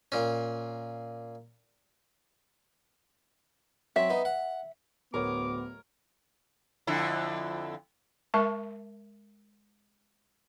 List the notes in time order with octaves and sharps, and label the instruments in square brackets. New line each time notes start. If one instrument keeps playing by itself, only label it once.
[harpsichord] A#2 C#4
[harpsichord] F#3 C4 [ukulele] E5
[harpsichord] B3 D#4
F#5
[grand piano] D1 [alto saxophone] B3 [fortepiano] A#4 C#5 [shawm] D6
[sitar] F2 D3 E4
[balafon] G#3 A#4 E5 A5 C#6